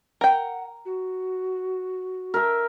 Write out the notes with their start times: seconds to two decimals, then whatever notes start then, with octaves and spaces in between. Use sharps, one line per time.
0.21 A#4 F#5 G5
0.85 F#4
2.34 A#4 E5